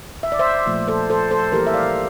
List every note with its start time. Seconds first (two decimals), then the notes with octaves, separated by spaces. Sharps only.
0.23 E5
0.32 D5
0.39 C5 E5
0.66 A#2 F3 A3
0.88 A4 C5
1.10 A4 C5
1.31 A4 C5
1.52 E3 G3 A#3 G4 A#4
1.66 E5
1.74 D5 F5